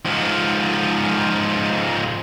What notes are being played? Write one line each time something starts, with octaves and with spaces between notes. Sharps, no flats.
G#2 F3